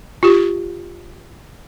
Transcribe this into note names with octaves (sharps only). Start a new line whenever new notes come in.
F4 G4